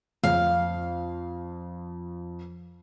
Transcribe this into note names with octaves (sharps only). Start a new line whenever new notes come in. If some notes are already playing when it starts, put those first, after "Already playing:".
F2 F5